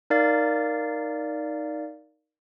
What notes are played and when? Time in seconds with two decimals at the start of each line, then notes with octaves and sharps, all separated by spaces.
0.10 D#4 A#4 D5 F5 A6